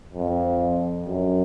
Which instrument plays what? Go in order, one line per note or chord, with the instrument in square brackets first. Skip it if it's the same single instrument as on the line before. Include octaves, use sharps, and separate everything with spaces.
[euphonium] F2
F#2